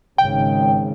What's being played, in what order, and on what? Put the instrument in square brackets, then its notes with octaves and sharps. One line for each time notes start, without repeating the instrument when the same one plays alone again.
[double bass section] G#1 C#3 [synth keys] G5